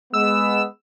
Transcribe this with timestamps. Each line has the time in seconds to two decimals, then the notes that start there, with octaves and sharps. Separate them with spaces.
0.14 G#3 B3 E6